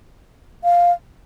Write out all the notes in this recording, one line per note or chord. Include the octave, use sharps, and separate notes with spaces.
F5